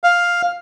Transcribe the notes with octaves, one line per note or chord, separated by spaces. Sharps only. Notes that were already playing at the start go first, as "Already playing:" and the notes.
F5